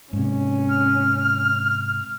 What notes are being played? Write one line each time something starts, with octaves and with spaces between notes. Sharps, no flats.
G#2 C3 C#4
F6